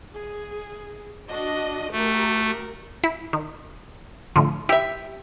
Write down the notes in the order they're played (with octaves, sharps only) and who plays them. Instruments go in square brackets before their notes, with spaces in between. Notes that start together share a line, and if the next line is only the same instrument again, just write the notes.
[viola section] G#4
D4 F#4 D#5
[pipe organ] A3 [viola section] F#4 G4 A#4
[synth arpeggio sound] E4
D#3
A2 D3 F3
[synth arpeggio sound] E4 [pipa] G4 E5